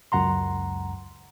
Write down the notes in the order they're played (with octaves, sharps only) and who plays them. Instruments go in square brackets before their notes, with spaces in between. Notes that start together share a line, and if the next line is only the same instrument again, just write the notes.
[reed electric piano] C#2 F#2 F#5 A#5 C6